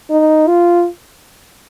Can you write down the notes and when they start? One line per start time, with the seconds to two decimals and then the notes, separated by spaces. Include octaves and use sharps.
0.10 D#4
0.47 F4